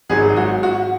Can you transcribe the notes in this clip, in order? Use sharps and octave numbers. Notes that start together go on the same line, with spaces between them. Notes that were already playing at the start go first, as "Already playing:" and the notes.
G#1 G#2 F#3 G#4
F#4
F#4